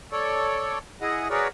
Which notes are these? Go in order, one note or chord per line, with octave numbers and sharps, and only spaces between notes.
A4 C#5 D5
E4 G#4 D#5 F#5
F#4 G#4 A#4 B4 C#5 D5